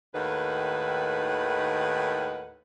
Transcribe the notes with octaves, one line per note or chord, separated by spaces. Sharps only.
D#2 A2 D#3 B4 F#5